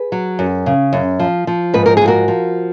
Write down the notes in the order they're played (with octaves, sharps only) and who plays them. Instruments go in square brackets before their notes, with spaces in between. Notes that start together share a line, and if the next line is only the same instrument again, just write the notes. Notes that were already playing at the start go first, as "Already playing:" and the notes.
Already playing: [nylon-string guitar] G#4 B4
F#3
F#2
C#3
F#2
F3
F3
G#2 B4
A#4
F3 G#4
F#4 A#4
F3